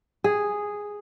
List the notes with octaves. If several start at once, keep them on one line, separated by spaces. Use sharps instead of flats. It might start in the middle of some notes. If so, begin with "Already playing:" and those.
G#4